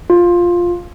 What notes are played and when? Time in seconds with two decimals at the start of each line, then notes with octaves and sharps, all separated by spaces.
0.10 F4